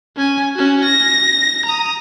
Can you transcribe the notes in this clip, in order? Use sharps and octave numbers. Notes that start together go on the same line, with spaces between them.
C#4 G#5
C#4 F#4
A#6
A#5 D#6